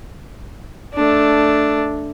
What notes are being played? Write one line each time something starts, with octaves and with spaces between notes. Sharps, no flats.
A3 D4